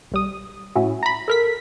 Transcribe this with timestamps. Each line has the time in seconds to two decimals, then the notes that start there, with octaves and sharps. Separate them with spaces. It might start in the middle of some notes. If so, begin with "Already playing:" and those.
0.12 B1 G3 D#6
0.76 A2 C#4 E4 F#4
1.03 A#5 B5
1.28 A4 A#4 B6